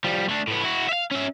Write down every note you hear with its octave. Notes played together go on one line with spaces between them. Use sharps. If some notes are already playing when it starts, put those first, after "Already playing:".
F3 G3
A3 D4
A2 B3
E4 F#4
E5 F5
C#4 E5